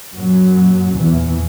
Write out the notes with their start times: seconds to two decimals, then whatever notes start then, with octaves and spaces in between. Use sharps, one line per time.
0.14 F#2 A#2 F#3
0.97 E2 A#2 E3